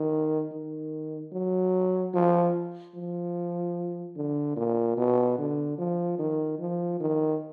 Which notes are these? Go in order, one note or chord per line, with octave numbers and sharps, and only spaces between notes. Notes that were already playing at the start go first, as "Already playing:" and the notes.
Already playing: D#3
D#3
F#3
F3
F3
D3
A#2
B2
D3
F3
D#3
F3
D#3